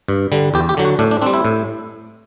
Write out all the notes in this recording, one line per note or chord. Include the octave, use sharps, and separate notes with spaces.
G2
D3 G3
E2 G4
G4
D3 F#3
F#4
A2 D4
D4
G3 C4 D4
E4
A2